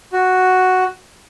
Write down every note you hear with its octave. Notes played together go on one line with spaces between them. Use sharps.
F#4